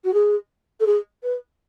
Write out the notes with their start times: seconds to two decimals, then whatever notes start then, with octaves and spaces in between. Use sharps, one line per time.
0.04 F#4
0.14 G#4
0.80 A4
0.86 G#4
1.23 B4